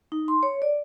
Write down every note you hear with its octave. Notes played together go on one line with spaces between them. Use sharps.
D#4
C6
C#5
D5